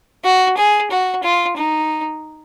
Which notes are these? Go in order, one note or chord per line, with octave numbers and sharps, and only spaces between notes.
F#4
G#4
F#4
F4
D#4